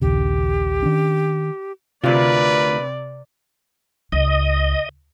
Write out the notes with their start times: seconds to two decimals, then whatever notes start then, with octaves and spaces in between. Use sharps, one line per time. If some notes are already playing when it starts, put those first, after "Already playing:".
0.02 A#1 D#2 C#3 G4
0.83 D#3 C#4 D4
2.04 D2 C3 F4 A#4 B4 D5
4.12 C#2 D#5